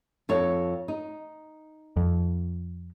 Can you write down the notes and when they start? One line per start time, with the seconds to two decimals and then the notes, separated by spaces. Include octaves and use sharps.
0.29 F2 A4 C#5
0.88 D#4
1.97 F2